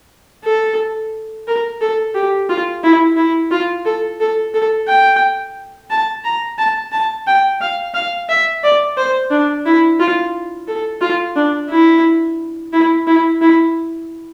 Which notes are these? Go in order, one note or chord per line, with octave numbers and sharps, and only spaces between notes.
A4
A#4
A4
G4
F4
E4
E4
F4
A4
A4
A4
G5
A5
A#5
A5
A5
G5
F5
F5
E5
D5
C5
D4
E4
F4
A4
F4
D4
E4
E4
E4
E4